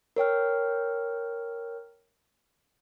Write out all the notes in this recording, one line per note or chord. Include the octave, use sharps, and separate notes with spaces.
A#4 C#5 G5 F6